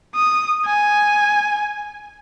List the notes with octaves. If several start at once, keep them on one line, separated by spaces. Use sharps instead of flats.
D#6
G#5